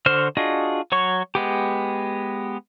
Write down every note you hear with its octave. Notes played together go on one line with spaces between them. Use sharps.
D3 F#4 C5 F6
D4 F4 F#4 G#4 D#5
F#3 C#5 C#6
G#3 B3 G4